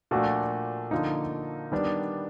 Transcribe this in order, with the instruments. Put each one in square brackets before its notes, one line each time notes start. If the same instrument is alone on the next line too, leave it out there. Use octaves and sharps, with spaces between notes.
[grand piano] A#2 F3 A3 D4 F#4
D3 F3 A#3 D#4
D#3 G3 B3 D4